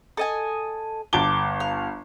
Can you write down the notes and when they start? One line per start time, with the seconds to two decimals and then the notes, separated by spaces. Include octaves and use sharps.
0.17 A4 D#5 G#5
1.13 G1 A5 D6 G7
1.60 F5